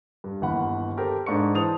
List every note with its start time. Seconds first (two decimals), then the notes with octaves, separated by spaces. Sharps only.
0.24 G2
0.41 G1 D#2 E3 F#5 B5
0.97 G4 A4 A#4 C5 G5
1.26 G#2 D4 C#6 C#7
1.54 E3 C5 A5 D#6 F7